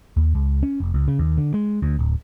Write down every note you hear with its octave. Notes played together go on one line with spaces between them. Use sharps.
D#2
C#2
C#4
F1
C#2
C#3
D#2
D3
G#3
D2
D1